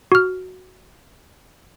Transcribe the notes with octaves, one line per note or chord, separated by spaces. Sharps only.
F#4 F6